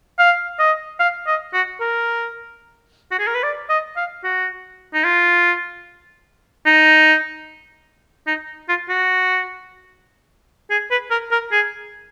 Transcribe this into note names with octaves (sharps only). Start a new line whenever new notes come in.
F5
D#5
F5
D#5
F#4
A#4
F#4
G#4
A#4
B4
D5
D#5
F5
F#4
D#4
F4
D#4
D#4
F4
F#4
G#4
B4
A#4
A#4
G#4